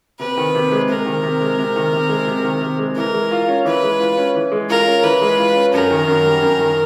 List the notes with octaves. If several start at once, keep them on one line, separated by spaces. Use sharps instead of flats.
C3 B4
D#3
C3
G#3
C3 A#4
D#3
C3
G#3
C3
D#3
C3
G#3
C3
D#3
C3
G#3
E3 A#4
G#3
F4
C#4
E3 B4
G#3
F4
C#4
E3
G#3
F4 A#4
C#4
E3 B4
G#3
F4
C#4
F#2 A#4
D#3
F#2
G3
F#2
D#3